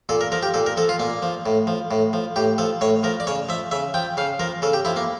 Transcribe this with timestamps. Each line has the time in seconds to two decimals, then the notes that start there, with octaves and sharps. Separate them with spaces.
0.09 A#2 A4
0.21 A#4
0.32 F3 A#4
0.43 G4
0.54 A#2 A4
0.66 A#4
0.77 F3 A4
0.89 F4
0.99 A#2 A#3
1.22 F3
1.46 A2
1.67 F3
1.91 A2
2.13 F3
2.36 A2 G4
2.58 F3 A4
2.81 A2 C#5
3.03 F3 A#4
3.20 D5
3.27 C#3 C#5
3.49 F3 E5
3.71 C#3 E5
3.94 F3 G5
4.17 C#3 F5
4.39 F3 A#4
4.62 C#3 A4
4.73 G4
4.85 F3 E4
4.96 A#3